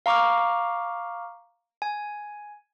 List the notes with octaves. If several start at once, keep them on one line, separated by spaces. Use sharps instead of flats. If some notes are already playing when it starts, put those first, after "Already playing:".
F5 A#5 C#6 D6 F6
G#5